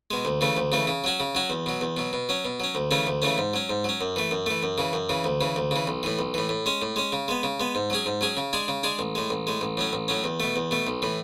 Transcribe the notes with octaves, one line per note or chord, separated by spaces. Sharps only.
B2 G#3
D2
C#3 E3 A3
D2
C#3 E3 A3
C#3
F#3 C#4 F#4
C#3
F#3 C#4 F#4
E2
B2 F#3
E2
B2 F#3
B2
F#3 C#4
B2
F#3 C#4
D2
C#3 E3 A3 C#4
D2
C#3 E3 A3 C#4
G#2
F#3 C#4
G#2
F#3 C#4
F#2
E3 A3
F#2
E3 A3
F#2
C#3 E3
F#2
C#3 E3
D2
C#3 E3
D2
C#3 E3
B1
A2 E3
B1
A2 E3
A2
G#3 C#4
A2
G#3 C#4
C#3
G#3 B3
C#3
G#3 B3
G#2
F#3 C#4 G#4
G#2
F#3 C#4 G#4
C#3
G#3 D4 G#4
C#3
G#3 D4 G#4
A1
A2 G#3
A1
A2 G#3
A1
A2 F#3 C#4
A1
A2 F#3 C#4
E2
B2 A3
E2
B2 A3
B1
A2 E3